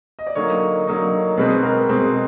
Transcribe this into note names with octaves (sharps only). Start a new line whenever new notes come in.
D#5
D5
D3 F#3 A#3 D#4 C#5
D3 F#3 A#3 D#4
B2 G#3 C4 B4
A#4
B2 G#3 C4